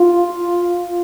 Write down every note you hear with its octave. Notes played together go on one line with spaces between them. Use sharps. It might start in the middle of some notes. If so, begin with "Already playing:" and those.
Already playing: F4